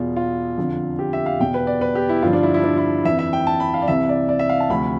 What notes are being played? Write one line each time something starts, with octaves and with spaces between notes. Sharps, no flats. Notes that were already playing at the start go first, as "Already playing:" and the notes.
Already playing: E2 B2 F4
F4
F2 D3 F3
G4
E5
F5
E2 B2 G5
B4
D5
B4
G4
E4
G2 D3 F3 F4
D4
E4
E4
D4
E4
F2 E3 E5
E5
G5
A5
B5
F5
D5
C2 C3 E3 E5
D5
D5
E5
F5
A5
D2 C3 F3 B5